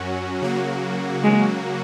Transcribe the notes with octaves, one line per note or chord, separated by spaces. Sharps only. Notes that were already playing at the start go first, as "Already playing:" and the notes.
Already playing: F#2 F#3 C#4 F#4
C#3 F#3 A#3 F#4
G#3